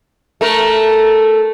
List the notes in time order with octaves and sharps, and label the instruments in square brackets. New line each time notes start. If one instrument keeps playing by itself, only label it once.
[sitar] A3 A#4